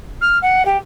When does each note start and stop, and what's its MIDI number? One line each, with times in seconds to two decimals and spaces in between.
0.21 0.38 89
0.42 0.65 78
0.65 0.77 67